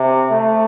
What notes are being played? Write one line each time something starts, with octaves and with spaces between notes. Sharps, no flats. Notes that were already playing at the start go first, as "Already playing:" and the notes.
Already playing: C3
A3